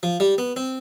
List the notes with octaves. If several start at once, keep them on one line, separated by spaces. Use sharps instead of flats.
F3
G3
B3
C4